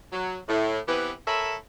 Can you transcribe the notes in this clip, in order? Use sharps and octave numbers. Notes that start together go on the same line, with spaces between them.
F#3
A2
E3 B3 C4 G4 B4
A4 A#4 C#5 E5 G#5 B5